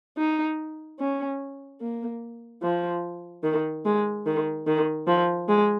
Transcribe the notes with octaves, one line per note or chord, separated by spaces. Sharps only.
D#4
C#4
A#3
F3
D#3
G#3
D#3
D#3
F3
G#3